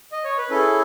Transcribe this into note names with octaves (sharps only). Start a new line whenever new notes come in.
D#5
C#5
B4
C#4 E4 G#4 A4